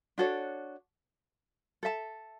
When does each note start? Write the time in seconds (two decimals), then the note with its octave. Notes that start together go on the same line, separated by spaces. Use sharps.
0.18 D4 F#4 A4 C#5
1.83 A4 E5 A5